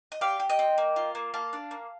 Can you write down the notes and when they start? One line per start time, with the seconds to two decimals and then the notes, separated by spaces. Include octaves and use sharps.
0.12 D#5
0.21 G4 D5 F5
0.40 G4
0.50 D#5 G5
0.59 C4
0.78 A#3
0.96 F4
1.15 A#3
1.34 A#3 F5 A5
1.53 D4
1.71 A#3